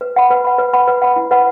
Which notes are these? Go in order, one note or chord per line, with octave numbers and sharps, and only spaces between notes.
B4
F#5 B5
B4
F#5 B5
B4
F#5 B5
B4
F#5 B5
E4
B4 F#5 B5